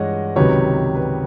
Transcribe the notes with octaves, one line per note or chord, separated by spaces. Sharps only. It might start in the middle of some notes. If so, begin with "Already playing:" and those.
Already playing: G2 E3 G#3 C#5 D#5 F#5
C#2 C3 D#3 F#3 B4 C#5
B4